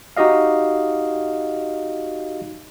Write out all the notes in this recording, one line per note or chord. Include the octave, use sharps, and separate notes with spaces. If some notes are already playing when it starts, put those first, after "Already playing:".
D#4 F#4 G4 D#5 F5